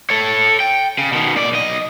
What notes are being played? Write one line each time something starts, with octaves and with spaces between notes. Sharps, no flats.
A4 C#5
G5
C#3
B2 D#3
A#2 D5
B1 D#5